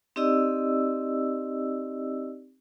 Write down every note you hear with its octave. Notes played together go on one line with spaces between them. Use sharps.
C4 D#4 G4 D5 D#5 E6